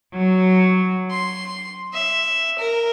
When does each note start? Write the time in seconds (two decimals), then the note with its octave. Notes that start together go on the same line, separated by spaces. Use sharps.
0.13 F#3
1.10 C6
1.93 E5
2.59 A#4